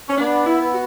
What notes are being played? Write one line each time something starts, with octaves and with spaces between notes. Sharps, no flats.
C#4
B3 D4
E4
B3
F#4